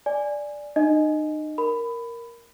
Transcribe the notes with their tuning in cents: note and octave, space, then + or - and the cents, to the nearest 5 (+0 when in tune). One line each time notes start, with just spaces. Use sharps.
D5 +0 G#5 +0
D#4 -40 D#5 +0
A#4 +0 B5 +15